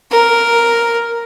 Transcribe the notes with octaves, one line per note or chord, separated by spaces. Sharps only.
A#4